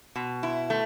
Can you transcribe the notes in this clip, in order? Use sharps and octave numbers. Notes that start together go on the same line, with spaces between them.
B2
E4
A3